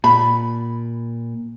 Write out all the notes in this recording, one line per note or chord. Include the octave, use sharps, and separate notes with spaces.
A#2 B5